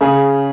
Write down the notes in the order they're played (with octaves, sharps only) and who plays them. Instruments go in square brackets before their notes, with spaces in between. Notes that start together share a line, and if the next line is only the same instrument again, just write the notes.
[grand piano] C#3 [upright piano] G#4